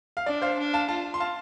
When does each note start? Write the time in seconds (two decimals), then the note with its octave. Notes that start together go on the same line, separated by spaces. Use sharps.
0.17 F5
0.26 D4 D5
0.42 C5 F5
0.58 D4
0.73 F5 A5
0.88 F4 F5 A5
1.14 C6
1.20 F5 A5